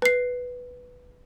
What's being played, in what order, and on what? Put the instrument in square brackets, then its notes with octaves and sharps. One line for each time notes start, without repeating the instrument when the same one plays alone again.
[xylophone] B4 C7